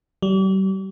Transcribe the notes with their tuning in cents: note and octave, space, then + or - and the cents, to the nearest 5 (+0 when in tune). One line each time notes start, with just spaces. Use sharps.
G3 -40